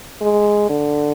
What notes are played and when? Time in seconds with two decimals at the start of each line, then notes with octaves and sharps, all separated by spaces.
0.21 G#3
0.69 D3